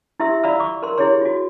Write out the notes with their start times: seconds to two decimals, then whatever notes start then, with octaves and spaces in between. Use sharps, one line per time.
0.20 E4 G4 E5 C6 E6
0.44 F4 D5 F5 A#5 B5 E6
0.60 C#6 D6
0.83 A#4 C6
0.98 E4 G4 G#4 C#5 C6
1.21 F4 F#4